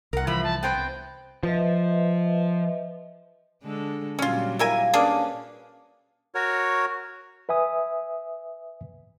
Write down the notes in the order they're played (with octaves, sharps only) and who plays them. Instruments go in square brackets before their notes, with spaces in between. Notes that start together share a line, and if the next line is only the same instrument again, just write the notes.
[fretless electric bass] C2 [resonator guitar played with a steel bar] A#4 F#5
[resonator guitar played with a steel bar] E3 F3 [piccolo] B5
[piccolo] A5
[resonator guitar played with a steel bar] B3 C4 C5 [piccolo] G5
[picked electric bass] F3 [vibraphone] B4 D#5 E5
[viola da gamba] D3 G#3 A4
[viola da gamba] A#2 F#3 G3 [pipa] C#4 F4
[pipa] E4 A#4 G#5 [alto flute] F5
[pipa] A#3 D4 G#4 [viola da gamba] C#4 B4
[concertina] F#4 A#4 C#5
[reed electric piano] B4 E5 G#5 D#6